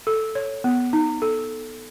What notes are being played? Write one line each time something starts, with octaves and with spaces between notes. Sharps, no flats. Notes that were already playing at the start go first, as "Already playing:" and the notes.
A4
C#5
B3
D#4
A4